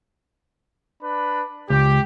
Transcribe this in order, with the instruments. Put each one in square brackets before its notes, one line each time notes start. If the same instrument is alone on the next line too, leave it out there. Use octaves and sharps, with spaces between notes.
[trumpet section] D4 B4 B5
[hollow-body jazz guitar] C#2 [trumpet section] G4